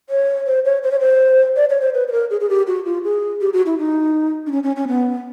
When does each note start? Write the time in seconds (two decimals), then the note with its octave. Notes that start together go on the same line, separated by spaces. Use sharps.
0.10 C#5
0.47 C5
0.65 C#5
0.83 C5
0.92 C#5
1.00 C5
1.56 D5
1.70 C#5
1.81 C5
1.94 B4
2.08 B4
2.12 A#4
2.30 G#4
2.41 G#4
2.49 G4
2.67 F#4
2.86 F4
3.04 G#4
3.41 G4
3.53 F#4
3.66 E4
3.78 D#4
4.47 D4
4.52 C#4
4.63 C#4
4.76 C#4
4.88 B3